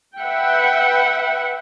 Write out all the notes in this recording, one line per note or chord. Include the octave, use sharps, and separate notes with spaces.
B4 E5 F#5 G5